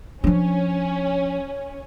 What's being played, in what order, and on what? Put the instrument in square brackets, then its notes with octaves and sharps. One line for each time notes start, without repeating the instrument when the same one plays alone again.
[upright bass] F3 D4 [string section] C#4